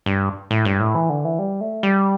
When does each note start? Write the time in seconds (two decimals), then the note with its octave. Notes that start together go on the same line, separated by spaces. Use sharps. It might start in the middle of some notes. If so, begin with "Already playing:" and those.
0.06 G2
0.51 A2
0.65 G2
0.80 A2
0.95 E3
1.10 D3
1.25 E3
1.39 G3
1.61 A3
1.83 G3